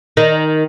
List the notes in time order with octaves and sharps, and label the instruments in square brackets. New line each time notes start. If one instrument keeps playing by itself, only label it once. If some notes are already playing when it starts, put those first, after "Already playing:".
[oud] D#3